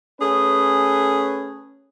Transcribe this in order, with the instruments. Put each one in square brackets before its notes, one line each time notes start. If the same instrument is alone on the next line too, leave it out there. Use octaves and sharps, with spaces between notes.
[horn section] A3 C#4 G#4 B4